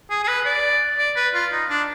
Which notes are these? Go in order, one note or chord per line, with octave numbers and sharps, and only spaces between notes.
G#4
G#4
B4
D5
D5
B4
F4
D#4
D4